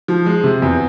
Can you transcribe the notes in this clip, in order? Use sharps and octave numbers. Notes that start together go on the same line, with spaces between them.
F3
G#3
C3
E2